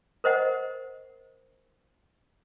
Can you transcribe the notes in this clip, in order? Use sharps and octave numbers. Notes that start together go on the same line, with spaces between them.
A#4 C5 D#5 F#5